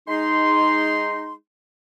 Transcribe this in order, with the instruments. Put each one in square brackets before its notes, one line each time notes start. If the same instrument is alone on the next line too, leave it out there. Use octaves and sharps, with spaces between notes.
[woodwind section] G#3 D#4 C6